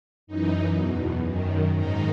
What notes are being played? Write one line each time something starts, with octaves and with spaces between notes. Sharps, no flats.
F#2 E3 D#4
E2 B2
F#2 D#3
G#2 D#3 D#4